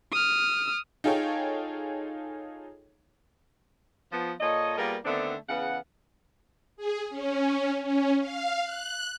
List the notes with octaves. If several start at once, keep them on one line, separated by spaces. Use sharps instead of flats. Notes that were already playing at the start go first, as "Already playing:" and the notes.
D#6 F6
D#4 F4 G#4 A4 C#5 G5
F3 B3 F4
A#2 A4 C#5 D#5
G3 A#3 B3 F4 G#4 A#4
D3 D#3 A3 B3 C4 D4
E2 C#3 B3 F5 F#5
G#4
C#4
C#4
F5
F#6